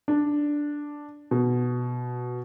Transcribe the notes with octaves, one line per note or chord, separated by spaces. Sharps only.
D4
B2